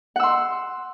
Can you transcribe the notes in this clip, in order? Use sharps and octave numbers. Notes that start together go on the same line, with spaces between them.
F#5 C6 E6